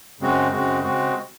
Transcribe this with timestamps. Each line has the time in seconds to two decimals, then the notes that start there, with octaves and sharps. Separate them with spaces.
0.20 F#2 C#3 G#3 C4 F#4
0.52 F#2 C#3 G#3 C4 F#4
0.83 C#3 G#3 C4 F#4